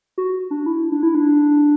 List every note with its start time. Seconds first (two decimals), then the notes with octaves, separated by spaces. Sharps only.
0.18 F#4
0.51 D4
0.66 E4
0.92 D4
1.03 E4
1.15 D4